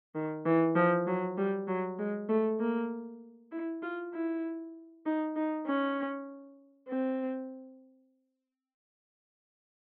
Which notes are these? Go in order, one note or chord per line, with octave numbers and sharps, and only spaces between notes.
D#3
E3
F3
F#3
G3
F#3
G#3
A3
A#3
E4
F4
E4
D#4
D#4
C#4
C4